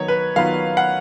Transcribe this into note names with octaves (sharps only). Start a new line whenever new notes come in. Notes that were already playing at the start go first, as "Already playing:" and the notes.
Already playing: D#3 F#3 B3 C#5
B4
D#3 F#3 B3 F4 B4 F5
F#5